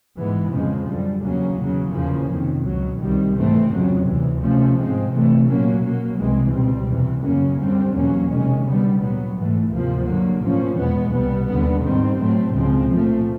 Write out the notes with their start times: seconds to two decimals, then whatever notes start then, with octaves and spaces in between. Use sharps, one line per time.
0.17 G#2 E3 G#3 B3
0.52 F2 C#3 F3 G#3
0.87 F#2 D3 G3
1.22 E2 C#3 F#3 A#3 C#4
1.58 E2 C#3 F#3
1.93 E2 C#3 F3 A#3 C#4
2.28 F2 C3 D#3
2.64 C#2 B2 F#3
2.99 C2 C3 D#3 G3
3.35 G#2 E3 A3 C4
3.70 F2 C#3 F#3
4.05 D2 C3 E3
4.41 C3 F3 A3 C#4
4.76 G#2 F3 G#3 C4
5.11 C3 E3 A3
5.47 A#2 F#3 A#3 C#4
5.82 B2 F#3 A#3
6.18 C2 C3 E3 G#3 C4
6.53 C#2 B2 G3 C4
6.89 E2 C3 E3
7.23 F#2 C#3 F#3 A#3 C#4
7.60 F#2 D3 G3 C4
7.94 E2 B2 F#3 A#3 C#4
8.29 C3 D#3 G#3 C#4
8.65 D2 D3 G3 B3
9.01 A#2 F#3 B3
9.35 G#2 E3 A3
9.71 D2 C3 F3 A#3
10.06 G2 D3 F#3 A#3
10.42 A2 F3 A#3 C#4
10.77 E2 B2 G#3 B3
11.13 C2 B2 G3 B3
11.48 D#2 D3 G3 B3
11.83 G#2 D#3 G3 C4
12.19 A2 F#3 A3 C4
12.54 C#2 C#3 F3 G#3 C4
12.89 A#2 F3 A3